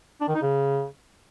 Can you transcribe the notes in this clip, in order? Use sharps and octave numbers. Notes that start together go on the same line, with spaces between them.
D4
D#3
D#4
C#3